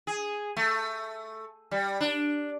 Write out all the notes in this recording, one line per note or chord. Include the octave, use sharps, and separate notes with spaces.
G#4
A3
G3
D4